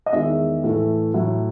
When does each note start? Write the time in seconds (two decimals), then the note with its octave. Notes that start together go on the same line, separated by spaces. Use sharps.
0.06 D#5
0.13 E2 D#3 G#3 E5
0.64 A2 E3 A3
1.14 A2 F#3 A3